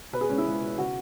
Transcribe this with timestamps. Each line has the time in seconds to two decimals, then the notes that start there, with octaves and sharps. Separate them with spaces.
0.13 B2 B4
0.21 G#4
0.29 C#2 C#4
0.38 E4
0.46 C#2
0.62 B2
0.78 C#3 F#4